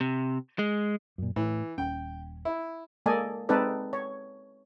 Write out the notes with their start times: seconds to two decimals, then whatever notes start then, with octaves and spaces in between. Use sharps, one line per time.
0.01 C3
0.59 G#3
1.18 F#2 A#2
1.36 A2 E3
1.78 D#1 C#4 G5
2.45 E4
3.06 G#3 A#3 A4 D5 D#5 G#5
3.49 G#3 C4 D#4 A4 B4 D5
3.93 C#5